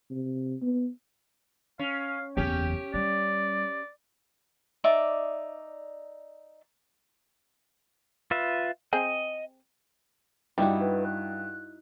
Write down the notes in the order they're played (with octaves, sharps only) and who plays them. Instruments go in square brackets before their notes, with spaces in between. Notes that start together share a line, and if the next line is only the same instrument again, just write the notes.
[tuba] C3
B3
[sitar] C#4 [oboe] F5
[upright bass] F#1 E2 [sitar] C#4 G4 [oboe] G5
[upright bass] G3 [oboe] D5
[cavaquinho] D#4 D5 E5 D6
[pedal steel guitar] F4 B4 E5
[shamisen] C4 G#4 [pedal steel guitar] D#5
[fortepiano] G2 [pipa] G3 [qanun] D#4 E4 F#4 [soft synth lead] D5
[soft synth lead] B4
F#6